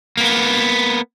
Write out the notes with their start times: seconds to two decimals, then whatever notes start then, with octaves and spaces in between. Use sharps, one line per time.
0.17 A#3 B3